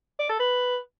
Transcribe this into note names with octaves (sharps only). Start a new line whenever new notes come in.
D5
A4
B4